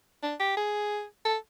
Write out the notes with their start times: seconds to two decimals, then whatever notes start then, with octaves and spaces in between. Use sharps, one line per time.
0.23 D4
0.40 G4
0.57 G#4
1.25 A4